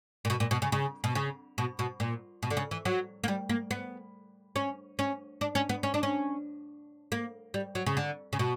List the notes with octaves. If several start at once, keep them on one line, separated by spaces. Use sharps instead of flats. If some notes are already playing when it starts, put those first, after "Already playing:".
A#2
B2
A#2
B2
C#3
C#3
B2
C#3
B2
B2
A#2
B2
D3
C#3
E3
F#3
A#3
G3
A#3
B3
C#4
C#4
D4
C#4
B3
C#4
D4
C#4
A#3
G3
F#3
C#3
D3
C#3
B2